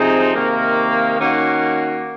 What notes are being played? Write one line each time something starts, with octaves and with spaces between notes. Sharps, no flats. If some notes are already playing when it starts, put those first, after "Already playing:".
Already playing: C3 F3 C4 D#4 G#4
C3 D#3 A#3
D#3 A#3 C#4 F#4